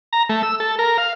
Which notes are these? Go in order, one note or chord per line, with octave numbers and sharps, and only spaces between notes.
A#5
A3
E6
A4
A#4
F5